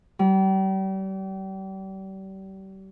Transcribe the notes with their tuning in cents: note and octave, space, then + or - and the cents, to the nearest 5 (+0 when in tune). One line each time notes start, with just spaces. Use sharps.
G3 -35